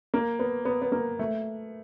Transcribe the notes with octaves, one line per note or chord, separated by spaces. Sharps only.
A#3
B3
B3
B3
A#3
A3